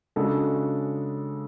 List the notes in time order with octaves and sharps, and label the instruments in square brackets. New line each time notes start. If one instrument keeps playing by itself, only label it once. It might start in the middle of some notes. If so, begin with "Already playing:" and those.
[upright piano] C#3 G#3 D4 F#4 A4